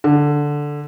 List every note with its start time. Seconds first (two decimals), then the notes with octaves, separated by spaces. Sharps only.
0.04 D3